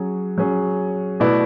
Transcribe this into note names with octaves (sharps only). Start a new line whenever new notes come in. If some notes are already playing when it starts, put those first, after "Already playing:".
Already playing: F#3 C#4 G#4
F#3 C#4 G#4
B2 A3 E4 B4 D5